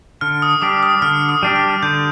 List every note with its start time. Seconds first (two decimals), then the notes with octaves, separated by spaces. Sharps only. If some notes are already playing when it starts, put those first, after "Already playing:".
0.21 D3 F6
0.42 D#6
0.62 G3 D4 G4 D6
0.83 D#6
1.02 D3 F6
1.29 D#6
1.43 G3 D4 G4
1.56 F6
1.83 D3 G6